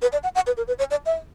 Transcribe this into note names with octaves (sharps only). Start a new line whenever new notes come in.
B4
D5
F#5
F#5
B4
A#4
B4
C#5
D5
E5